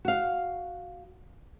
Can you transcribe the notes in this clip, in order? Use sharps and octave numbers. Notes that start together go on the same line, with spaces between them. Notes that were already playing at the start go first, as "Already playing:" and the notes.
F#4 F5